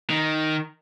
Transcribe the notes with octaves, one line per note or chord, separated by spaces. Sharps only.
D#3